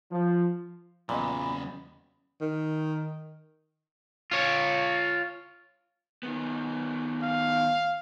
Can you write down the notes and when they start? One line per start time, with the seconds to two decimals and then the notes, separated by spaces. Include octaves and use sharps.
0.12 F3
1.09 E2 A#2 C#3 F#3 D5 D#5 B5
2.41 D#3
4.31 F4 C#5
6.23 D#3 B3
7.23 F5